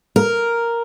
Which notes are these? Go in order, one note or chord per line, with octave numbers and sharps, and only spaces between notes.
A#4